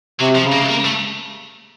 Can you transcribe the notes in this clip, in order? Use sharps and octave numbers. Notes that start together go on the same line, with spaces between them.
C3 F#3
F3
C#3
A#3
A#3
A3